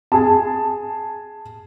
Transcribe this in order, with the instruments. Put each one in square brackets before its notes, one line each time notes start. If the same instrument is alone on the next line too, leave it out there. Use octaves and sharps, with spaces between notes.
[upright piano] G#4 A5